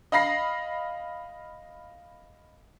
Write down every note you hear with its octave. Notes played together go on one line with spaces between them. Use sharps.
D#5 F5 B5 A#6 C7